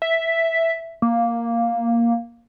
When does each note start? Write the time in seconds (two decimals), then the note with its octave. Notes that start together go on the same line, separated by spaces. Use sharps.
0.02 E5
1.02 A#3